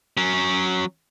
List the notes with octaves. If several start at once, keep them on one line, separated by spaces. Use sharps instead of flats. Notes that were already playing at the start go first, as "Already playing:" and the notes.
F#3 C#4